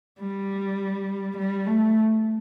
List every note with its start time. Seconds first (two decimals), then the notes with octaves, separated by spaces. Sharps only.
0.20 G3
1.37 G3
1.66 A3